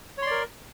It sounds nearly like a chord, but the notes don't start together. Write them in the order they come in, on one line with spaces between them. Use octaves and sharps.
C#5 C6 D5 A#4